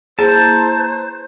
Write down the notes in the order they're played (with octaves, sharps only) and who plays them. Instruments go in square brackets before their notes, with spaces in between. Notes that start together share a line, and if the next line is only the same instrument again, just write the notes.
[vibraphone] A#3 E4 A#5 [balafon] G#4 [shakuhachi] C5 [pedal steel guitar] A5